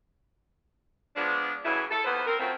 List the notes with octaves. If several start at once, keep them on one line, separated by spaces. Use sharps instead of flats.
F3 G#3 B3 D4
C#3 E3 F#3 A3 E4 G#4
A4
D#2 E3 B3 B4 C5
C4 A#4
C#3 F3 F#3 A3 C4